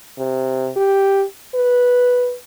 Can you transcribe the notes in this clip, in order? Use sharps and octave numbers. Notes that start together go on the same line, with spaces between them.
C3
G4
B4